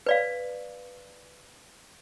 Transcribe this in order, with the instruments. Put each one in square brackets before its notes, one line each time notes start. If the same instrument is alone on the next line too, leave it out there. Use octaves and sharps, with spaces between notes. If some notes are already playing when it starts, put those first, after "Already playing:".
[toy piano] B4 D5 F5